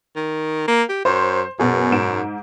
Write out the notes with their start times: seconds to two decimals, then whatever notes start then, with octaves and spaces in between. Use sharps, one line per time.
0.16 D#3
0.68 A#3
0.89 G4
1.05 F#2 C5
1.59 F#2 B2 G#4
1.92 G#2 D7 E7